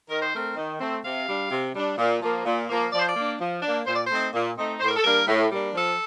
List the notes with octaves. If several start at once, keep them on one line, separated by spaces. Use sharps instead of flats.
D#3 A#4
C5
A3 C4 A#4
D#3
A3 C4
C3 F5
G3 D4
C3
G3 D4
A#2
F3 A#3
A#2
F3 A#3
F3 D5
C5
D5
A#3 D4
F3
A#3 D4
A#2 C5
D5
C5
A3 C4 D#4
A#2
A3 C4 D#4
A2 C5
A#4
A4
G3 A#3 D4 A#4
A2
G3 A#3 D4
F3 A4